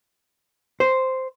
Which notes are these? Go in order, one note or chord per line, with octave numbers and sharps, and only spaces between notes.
C5